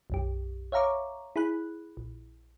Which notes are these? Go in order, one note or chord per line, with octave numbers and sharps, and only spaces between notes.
B1 F#2 G4
C#5 E5 F5 A#5 C#6 D6
E4 G#4 B5 F#6
A#1